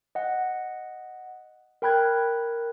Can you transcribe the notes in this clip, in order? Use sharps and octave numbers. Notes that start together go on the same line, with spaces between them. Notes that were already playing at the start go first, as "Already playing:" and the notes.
D#5 F#5
A#4 G5 B5 F#6 G#6